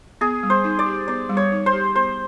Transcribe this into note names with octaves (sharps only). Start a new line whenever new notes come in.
B3 G#4
G3
C5
D#4
D5
G4
B3 D5
G3
C#5
D#4
C5
G4
B3 C5